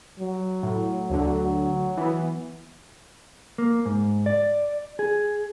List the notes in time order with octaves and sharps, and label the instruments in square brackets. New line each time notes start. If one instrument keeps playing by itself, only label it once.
[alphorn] F#3
[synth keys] A2
D2 D3
E3 B3
[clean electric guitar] A#3
G#2
D5
G#4